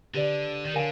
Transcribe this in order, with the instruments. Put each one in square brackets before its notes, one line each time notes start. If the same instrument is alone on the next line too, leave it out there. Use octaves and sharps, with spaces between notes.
[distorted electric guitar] D3 [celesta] G4 B4 D5
[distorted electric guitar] D#3
[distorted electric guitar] D3 [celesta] A#4 C#5 F5 G#5